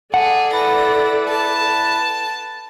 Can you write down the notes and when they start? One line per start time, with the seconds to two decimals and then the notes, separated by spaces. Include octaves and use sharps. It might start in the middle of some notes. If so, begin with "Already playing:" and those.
0.14 G#4 A4 D5 F#5 A5
0.53 E4 B4 A#6
1.28 A5